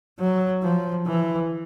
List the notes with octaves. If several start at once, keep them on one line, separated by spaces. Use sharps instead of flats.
F#3
F3
E3